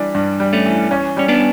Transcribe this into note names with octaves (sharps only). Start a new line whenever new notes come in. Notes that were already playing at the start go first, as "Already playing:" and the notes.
Already playing: E3 G3 D4
G2
G3
A3 C#4
E3
C#4
G3 C#4
B3 D4